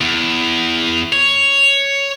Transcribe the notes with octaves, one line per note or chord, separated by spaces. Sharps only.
E2
C#5